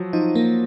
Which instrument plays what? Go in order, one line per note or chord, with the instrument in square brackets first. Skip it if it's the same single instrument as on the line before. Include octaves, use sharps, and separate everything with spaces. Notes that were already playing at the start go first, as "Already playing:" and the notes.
Already playing: [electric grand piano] F3 F#3
[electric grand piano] F3 [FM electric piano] D#4
[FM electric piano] A#3